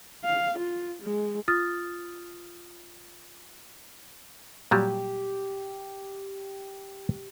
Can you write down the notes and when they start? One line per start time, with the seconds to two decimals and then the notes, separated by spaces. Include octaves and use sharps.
0.24 F5
0.58 F4
1.02 G#3
1.48 F4 D#6 F6 A6
4.71 A#2 F#3 G3 G4